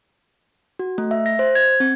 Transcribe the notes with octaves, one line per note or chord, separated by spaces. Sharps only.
F#4
A3
E5
A#6
C5
G#6
C4